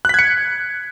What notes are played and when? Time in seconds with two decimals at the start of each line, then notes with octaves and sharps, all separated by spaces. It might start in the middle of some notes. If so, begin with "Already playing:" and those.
0.05 F#6
0.09 B6
0.14 G#6
0.19 C#7